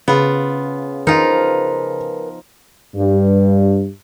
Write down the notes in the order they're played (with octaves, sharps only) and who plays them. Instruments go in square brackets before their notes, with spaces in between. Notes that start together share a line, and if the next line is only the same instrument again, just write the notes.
[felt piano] C#3 [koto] B3 F4
[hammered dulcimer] F3 [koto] D#4 F4 [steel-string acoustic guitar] A#4 B4 G#5
[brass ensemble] G2